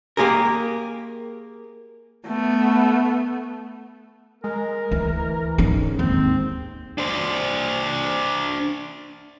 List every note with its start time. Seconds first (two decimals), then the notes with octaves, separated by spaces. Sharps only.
0.17 A#3 G4 G#4 A#4
2.26 A3 B3
4.44 G#3 A#4
4.91 D2 E3
5.58 G#2 D3 C#4
5.99 D#2 C4
6.98 D4 C5